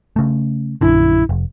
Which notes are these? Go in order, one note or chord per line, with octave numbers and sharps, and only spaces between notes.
C#3 A3
A#1 F#2 D3 E4
F1